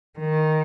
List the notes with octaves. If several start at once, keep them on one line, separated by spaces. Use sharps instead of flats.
D#3